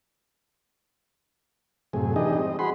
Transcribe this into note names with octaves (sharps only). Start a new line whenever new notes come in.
F#2 A2 C3 G#4
E3 D4 D#4 G4 G#4 D#5
G3 C4 D#5
F#4 G#4 B5 C6